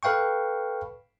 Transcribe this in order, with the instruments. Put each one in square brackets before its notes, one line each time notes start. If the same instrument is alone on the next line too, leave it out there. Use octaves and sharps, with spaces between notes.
[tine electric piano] A4 B4 F5 G5 C#6